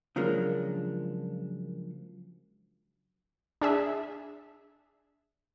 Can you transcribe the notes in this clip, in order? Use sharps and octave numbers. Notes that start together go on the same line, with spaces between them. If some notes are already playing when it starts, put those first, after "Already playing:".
C#3 F3 F#3 G#3 A#3 D4
D4 G#4 E5